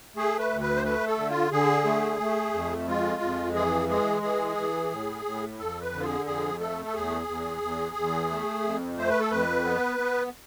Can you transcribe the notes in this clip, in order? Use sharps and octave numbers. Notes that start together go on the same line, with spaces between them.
A3 G#4
B4
D2
B4
C5
A3 B4
A4
D3
F4
D3 G#4
A3
A3
F2
G#3 F4
F2
E3 G#4
G#3 G#4
E3 G#4
E3
A2
A2
F2 A4
B4
D3
F4
G#4
F2 G#4
A3 A4
A4
E2 G#4
E2
E2
E2
A3
F2
A3 C5
B4
A4
F2 B4
B3
B3